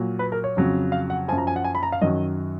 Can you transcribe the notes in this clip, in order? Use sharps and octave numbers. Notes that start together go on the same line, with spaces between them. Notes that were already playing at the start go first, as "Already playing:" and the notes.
Already playing: A#2 F#3
B4
A#4
C#5
F2 C#3 F#3
F5
F#5
F#2 F3 G#5
A#5
G#5
F#5
G#5
B5
A#5
F5
F#2 D#3 F#3 D#5